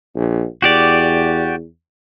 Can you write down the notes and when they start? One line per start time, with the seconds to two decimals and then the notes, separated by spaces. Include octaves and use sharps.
0.16 A#1
0.62 E2 F#4 G4 D5